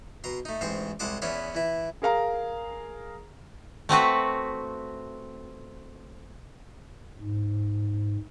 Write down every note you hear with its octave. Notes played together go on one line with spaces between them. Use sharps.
B2 A#5 C6
A3 D#4
A1 G#2 C4 C5 C6 C#6
C2 G#3 F#5 A5 C6 D6
E2 B3 C#4 E4 D5 C6
E3 E4
G#4 A#4 F5 A#5
A3 C4 F#4 B4
G#2